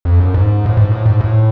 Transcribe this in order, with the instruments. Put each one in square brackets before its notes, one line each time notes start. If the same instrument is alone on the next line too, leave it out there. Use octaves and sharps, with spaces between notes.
[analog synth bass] F2
F#2
G#2
A2
G#2
A2
G#2
A2